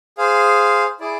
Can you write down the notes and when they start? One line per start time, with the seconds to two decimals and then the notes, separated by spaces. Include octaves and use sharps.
0.18 G#4 C5 F5
1.00 E4 G#4 D5